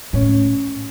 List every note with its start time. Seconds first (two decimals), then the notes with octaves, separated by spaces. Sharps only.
0.13 A2 C#4